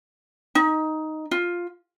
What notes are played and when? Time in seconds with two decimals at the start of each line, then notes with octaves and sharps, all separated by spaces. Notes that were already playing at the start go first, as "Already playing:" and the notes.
0.55 D#4
1.31 F4